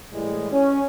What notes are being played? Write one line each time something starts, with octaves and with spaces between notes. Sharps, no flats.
A2 E3 G3 G#3
C#4